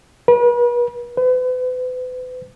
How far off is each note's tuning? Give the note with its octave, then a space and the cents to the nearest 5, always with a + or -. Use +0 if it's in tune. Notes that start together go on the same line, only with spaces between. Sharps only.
B4 -40
B4 +40